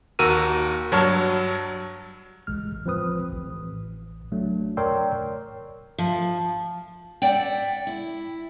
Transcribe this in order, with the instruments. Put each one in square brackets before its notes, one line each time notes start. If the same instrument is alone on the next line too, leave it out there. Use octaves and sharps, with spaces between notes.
[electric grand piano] D#2 F#4 A#4 E6 D#7
G2 F#3 C#5 A5 C#6 F6
[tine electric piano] A1 G#3 F6
F3 C4 B4 D#6
A1
F#3 A3 D4
A#4 C#5 D5 G5 C6 E6
[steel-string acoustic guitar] F3
D5 E5 F#5 G5
E4